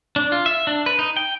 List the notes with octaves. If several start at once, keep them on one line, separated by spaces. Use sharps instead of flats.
D4
F4
E5
D4
B4
D#4
G5